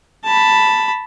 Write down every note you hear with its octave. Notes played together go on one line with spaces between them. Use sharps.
A5 B5